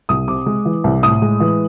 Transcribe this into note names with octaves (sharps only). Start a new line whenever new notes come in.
C2 D#6
C3 D6
G#3
E3
C2
A2 D#6
G#3
E3